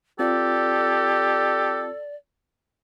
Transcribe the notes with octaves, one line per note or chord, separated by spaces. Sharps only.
C4 F4 G4 A4 D5